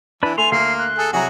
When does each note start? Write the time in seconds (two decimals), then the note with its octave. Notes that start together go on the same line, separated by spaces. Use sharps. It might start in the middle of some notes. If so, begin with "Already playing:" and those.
0.23 E3 D4 B4
0.38 A3 G#5 C6 F7
0.52 D2 A#3 C7
0.79 F#6
0.98 G#4 A4
1.13 C2 F#3 E4 F#4 G#4 A#5